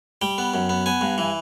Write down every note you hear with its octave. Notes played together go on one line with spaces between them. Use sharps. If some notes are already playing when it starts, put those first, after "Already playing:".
G3 G5
B3
F#2
B3
B3 G#5
G2
E3